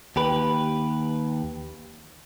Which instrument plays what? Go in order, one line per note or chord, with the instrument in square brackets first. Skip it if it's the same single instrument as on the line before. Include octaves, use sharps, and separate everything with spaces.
[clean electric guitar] D#2 G4 B4